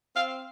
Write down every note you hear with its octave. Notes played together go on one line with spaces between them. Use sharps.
C4 F5